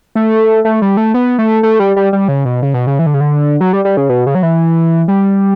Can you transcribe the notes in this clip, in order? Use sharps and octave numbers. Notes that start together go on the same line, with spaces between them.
A3
A3
G3
A3
B3
A3
A3
G3
G3
G3
C#3
B2
C#3
B2
C#3
E3
D3
C#3
D3
F#3
G3
G3
C#3
B2
C#3
F#3
E3
G3